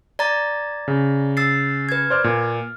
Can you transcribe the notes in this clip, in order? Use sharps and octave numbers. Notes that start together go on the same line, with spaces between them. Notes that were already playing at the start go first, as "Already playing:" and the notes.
D5 A#5 A6
C#3
E6 A6 C7
B4 G#6
C5 D5 F6
A#2